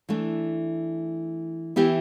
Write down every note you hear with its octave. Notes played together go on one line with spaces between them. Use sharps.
E3 A3 D4
E3 B3 E4 G4